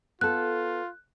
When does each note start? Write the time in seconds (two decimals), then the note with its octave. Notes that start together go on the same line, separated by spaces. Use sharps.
0.21 B3 F4 A4 F#6